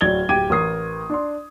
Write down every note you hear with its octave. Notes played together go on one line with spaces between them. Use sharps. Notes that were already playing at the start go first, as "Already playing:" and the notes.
D1 F#3 D5 G#6 A6 G7
D1 G4 G5 D6 G#6 D#7
A1 A#4 D#6 C7
D4 C6